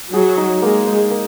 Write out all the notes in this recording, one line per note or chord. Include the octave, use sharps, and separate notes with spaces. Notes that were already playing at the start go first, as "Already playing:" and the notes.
F#3 G#4
D#4
G#3 A#3
D#4
A#3